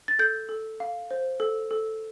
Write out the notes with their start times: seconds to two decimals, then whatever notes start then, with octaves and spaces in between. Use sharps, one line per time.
0.08 A6
0.19 A4 G6
0.49 A4
0.80 F5
1.11 C5
1.40 A4
1.71 A4